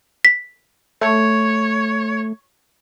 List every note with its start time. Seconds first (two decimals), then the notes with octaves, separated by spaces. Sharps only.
0.25 B6
1.01 A3 C#5